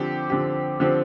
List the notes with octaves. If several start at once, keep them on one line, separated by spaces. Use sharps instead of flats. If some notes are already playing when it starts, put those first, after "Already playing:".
Already playing: D3 F3 C4 G4
D3 F3 C4 G4
D3 F3 C4 G4